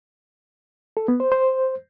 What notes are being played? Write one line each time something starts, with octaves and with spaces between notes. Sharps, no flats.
A4
B3
C5
C5